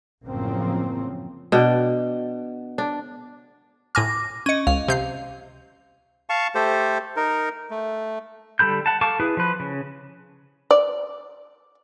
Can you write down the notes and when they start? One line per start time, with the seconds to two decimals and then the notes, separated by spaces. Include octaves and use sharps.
0.25 A1 F#2 C#3 F3 A#3 C4
1.52 B2 D4 G5
2.78 D4
3.95 A2 G#5 D6 F6 A#6
4.46 C#4 D#5 C#7 D#7
4.67 C#2 F5
4.88 C3 G6 C7
6.30 F5 A5 C#6
6.55 A3 G4 A4 C5
7.16 D#4 A#4
7.71 A3
8.59 D3 G3 A4 B5 G6
8.86 F#5 A5
9.01 A4 F5 A5 C#6 D6
9.20 E4 G#4 B4
9.37 F3 B4
9.60 C#3
10.71 D5